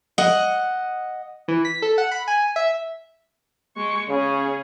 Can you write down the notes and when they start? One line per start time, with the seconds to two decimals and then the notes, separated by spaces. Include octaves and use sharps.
0.18 D#5 F#5
1.48 E3
1.65 B6
1.82 A4
1.98 F#5
2.11 B5
2.28 G#5
2.56 E5
3.76 G#3 C#6
4.09 C#3 C#4 G#4